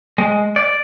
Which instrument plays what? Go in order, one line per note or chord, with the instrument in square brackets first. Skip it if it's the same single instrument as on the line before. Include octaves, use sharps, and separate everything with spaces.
[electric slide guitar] G#3
D5